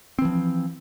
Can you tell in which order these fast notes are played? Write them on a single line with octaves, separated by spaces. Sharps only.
C4 E3 F3